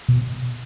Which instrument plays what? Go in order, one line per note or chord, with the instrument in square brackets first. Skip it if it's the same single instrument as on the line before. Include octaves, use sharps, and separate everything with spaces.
[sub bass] B2